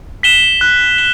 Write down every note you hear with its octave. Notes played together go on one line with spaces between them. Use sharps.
B6 E7 G7
F#6
G7